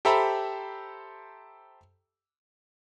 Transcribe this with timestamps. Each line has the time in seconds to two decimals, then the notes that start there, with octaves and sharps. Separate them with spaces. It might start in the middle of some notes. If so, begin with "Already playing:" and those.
0.05 G4 A4 C5 E5 A#5 B5